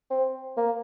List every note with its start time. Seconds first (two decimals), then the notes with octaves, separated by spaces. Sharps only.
0.11 C4
0.57 A#3